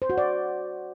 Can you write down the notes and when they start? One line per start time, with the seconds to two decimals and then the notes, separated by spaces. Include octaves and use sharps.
0.02 C5
0.10 F#4
0.18 D5